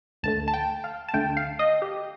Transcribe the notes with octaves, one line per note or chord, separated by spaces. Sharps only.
D2 D3 A3 A5
A5
G5
F5
A5
D2 D3 A3 G5
F5
D#5
G4